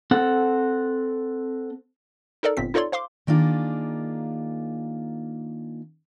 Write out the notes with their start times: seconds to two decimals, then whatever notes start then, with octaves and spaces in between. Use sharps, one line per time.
0.11 C4 A4 F#5
2.43 D#4 A4 A#4 D5
2.57 G1 A#2 C4 B6
2.74 D#4 F4 A4 C#5 D5 C6
2.92 C5 F5 C6 D6
3.27 D#3 A#3 D4 F4 G#4